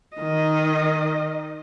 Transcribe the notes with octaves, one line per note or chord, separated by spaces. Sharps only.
D#3 D#5